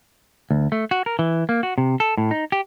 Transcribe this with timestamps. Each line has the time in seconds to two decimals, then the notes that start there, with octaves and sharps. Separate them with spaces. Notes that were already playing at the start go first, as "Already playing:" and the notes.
0.51 D2
0.72 A3
0.91 F#4
1.06 A#4
1.19 E3
1.49 A#3
1.63 F#4
1.78 C3
2.00 A4
2.17 A2
2.31 D#4
2.52 G4